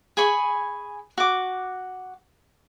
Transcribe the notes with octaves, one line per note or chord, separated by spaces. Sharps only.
G#4 G#5 B5 C#6
F#4 D6